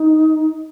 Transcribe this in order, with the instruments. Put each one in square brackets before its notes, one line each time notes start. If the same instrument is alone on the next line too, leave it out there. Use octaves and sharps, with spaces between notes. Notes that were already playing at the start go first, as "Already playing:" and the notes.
Already playing: [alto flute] D#4